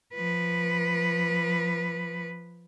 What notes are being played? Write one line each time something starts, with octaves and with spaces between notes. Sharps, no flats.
F3 B4